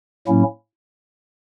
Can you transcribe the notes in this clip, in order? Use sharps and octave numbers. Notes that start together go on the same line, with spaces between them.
A2 F#3 A#3 C#4 E4